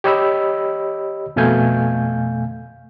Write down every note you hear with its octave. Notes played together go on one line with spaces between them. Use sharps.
G4 C#5 D#5 B5 E6
F2 B2 A3 F5 G#5 G6